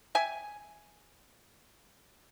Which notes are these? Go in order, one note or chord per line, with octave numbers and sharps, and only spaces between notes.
E5 G5 G#5